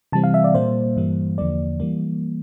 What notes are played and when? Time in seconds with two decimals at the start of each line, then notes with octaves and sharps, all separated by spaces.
0.12 C3 E3 G3 C4 A5
0.24 F5
0.34 E5
0.44 D5
0.55 A#2 G3 A#3 C5
0.97 G2 E3 G3 A#3
1.38 E2 D3 F3 A#3 D5
1.80 E3 G3 A#3